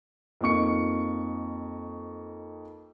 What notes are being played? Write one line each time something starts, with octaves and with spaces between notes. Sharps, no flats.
F2 A#3 D#4 C#6 C#7